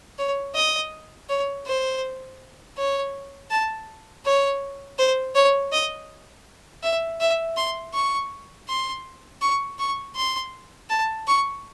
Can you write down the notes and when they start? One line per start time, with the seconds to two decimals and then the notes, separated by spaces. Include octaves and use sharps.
0.18 C#5
0.55 D#5
1.29 C#5
1.66 C5
2.77 C#5
3.51 A5
4.25 C#5
4.98 C5
5.35 C#5
5.72 D#5
6.83 E5
7.20 E5
7.57 C6
7.94 C#6
8.68 C6
9.41 C#6
9.79 C#6
10.16 C6
10.89 A5
11.27 C#6